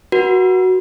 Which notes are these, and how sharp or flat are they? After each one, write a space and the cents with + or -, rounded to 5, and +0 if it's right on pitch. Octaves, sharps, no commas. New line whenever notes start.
F#4 +5 B4 -45